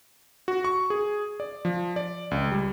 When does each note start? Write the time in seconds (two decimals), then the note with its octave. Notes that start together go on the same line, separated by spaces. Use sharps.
0.48 F#4
0.64 C#6
0.90 G#4
1.40 D5
1.65 F3
1.96 D5
2.31 C#2
2.52 G3